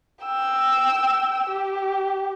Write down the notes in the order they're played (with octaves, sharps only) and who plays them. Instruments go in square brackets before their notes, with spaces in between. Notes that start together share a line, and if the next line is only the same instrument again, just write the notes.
[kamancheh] G5 E6
G4